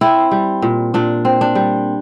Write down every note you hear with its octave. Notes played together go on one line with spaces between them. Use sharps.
C4 E4
G3
A#2
A#2 D4
C4
D4
G3